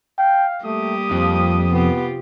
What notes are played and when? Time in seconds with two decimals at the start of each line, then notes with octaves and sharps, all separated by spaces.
0.19 F5 G5
0.64 G3 A3 A#3 G4 D#6
1.11 F2 F3
1.71 C3 B3 F4 G4